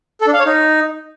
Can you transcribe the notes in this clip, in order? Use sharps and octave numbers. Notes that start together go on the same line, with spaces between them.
A4
D4
F5
C#5
D#4